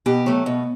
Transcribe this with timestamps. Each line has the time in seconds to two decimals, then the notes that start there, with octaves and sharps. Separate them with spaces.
0.06 B2 G4
0.26 F#3 A3
0.46 B2